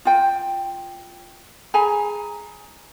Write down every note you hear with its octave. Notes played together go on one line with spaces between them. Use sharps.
F4 G5
G#4 G#5 A#5 B5